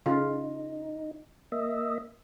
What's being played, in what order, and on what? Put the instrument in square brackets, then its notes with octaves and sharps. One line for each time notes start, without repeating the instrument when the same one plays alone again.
[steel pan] C#3 F4 [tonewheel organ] D#4
[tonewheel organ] A#3 D#5 E5